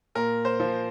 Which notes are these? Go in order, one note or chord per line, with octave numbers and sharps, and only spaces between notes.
A#2 A#4
C5
F3